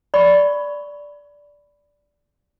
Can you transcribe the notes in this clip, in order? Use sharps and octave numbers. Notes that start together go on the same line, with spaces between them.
D5 B5 C#6